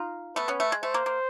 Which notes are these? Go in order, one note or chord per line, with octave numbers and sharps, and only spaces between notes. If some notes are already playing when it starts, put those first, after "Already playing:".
Already playing: D#4 F4
A3 B3 B4
B3 C#4
A3
G#3
A3 C5
A#3
A#3